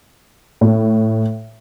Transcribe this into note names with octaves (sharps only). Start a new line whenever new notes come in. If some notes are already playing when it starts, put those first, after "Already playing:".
A2